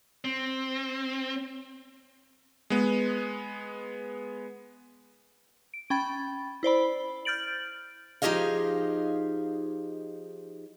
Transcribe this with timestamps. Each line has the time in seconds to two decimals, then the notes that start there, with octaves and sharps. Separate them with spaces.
0.25 C4
2.70 G#3 B3
5.74 D7
5.90 C#4 G5 B5 A6
6.63 E4 C5 D5 B5
7.25 F6 G6 A6 D7 F#7
8.22 F3 D#4 G4 G#4 D#5 F5